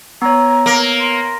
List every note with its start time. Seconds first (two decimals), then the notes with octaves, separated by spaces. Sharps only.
0.22 B3 C#5 A#5
0.66 A#3
1.00 C6